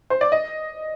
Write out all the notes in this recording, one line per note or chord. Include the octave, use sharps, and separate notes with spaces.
C5
D5
D#5